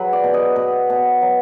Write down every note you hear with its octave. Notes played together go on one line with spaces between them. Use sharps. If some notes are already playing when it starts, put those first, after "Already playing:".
Already playing: F#3 G#4 B4
D5
B2
D#5
B2
B2
F#3